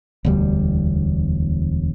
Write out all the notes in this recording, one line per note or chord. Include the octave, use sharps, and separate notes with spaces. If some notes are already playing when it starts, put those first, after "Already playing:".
E1 D2 G3